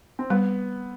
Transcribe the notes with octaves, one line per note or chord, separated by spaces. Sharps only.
C4
G3 B3